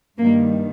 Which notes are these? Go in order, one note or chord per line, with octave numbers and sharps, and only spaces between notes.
G2 D#3 G3 A#3